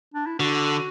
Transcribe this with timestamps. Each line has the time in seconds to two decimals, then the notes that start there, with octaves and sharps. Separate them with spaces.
0.14 D4
0.27 E4
0.39 D3 F#4